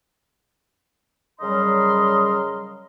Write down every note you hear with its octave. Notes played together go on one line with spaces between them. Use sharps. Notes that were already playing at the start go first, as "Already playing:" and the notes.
C#3 F#3 G3 A#4 D#5 C6